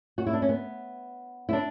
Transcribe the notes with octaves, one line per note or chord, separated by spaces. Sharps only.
F#4
E4
D4
C#4
B3
E4
D4